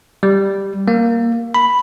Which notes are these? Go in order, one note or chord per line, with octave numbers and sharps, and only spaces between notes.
G3
A#3
B5